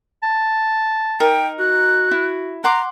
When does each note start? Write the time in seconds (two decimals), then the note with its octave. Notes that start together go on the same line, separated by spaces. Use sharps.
0.23 A5
1.20 D#4 A#4 G5
1.59 F#4 F#6
2.11 E4
2.64 F#5 A#5 C6 D6